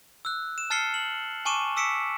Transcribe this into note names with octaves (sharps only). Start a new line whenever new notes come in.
E6 F#6
E7
A5 F6 A6 C7 C#7 G7
F#7
G#5 A5 C#6 D6 D#7 E7
D6 E6 B6 C#7 D7 E7